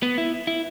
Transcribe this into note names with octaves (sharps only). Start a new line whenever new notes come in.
B3
E4
E4